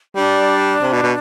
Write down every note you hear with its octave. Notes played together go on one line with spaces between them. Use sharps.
G3 D4
C3
B2
B2